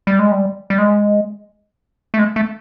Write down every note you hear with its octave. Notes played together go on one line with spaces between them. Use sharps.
G3
G#3
G3
G3
G#3
A3
G#3
A3